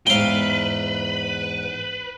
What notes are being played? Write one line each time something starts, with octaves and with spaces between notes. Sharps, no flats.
E2 G#2 B4 F5 G5